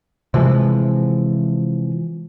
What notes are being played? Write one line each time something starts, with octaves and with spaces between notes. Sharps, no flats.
C3 E3 F3 G#3